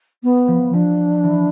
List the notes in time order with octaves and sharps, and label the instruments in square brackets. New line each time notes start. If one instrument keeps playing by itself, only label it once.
[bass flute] B3
[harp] F3
[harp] F3 [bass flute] D4
[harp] E3